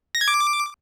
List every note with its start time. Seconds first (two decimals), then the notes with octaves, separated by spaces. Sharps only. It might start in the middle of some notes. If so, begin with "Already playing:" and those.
0.15 A#6
0.21 G#6
0.28 D6